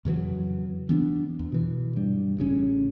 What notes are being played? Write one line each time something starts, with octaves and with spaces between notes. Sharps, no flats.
F2 C#3 E3 F#3
E3 B3 D4
E2
B2 E3
G2 G3
A1 C#3 C#4